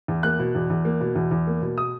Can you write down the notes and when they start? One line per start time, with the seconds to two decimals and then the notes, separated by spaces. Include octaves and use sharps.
0.08 E2
0.23 A#3 F#6
0.39 B2
0.55 E2
0.70 E2
0.85 A#3
1.01 B2
1.16 E2
1.31 E2
1.47 A#3
1.62 B2
1.78 D#6